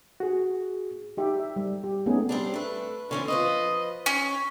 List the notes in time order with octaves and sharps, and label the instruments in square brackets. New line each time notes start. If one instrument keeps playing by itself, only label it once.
[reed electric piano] F#4 G#4
[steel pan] D#4 G4 E5
E5
G3
G4
A3 B3 C#4 D#4 G#4
[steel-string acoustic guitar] G3 C4 D4
[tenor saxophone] A3 [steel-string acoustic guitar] D4 B4
[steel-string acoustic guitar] D3 E3 C4 [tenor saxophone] C#4
[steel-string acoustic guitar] F3 B4 C5 [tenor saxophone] D#5
[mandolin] C#4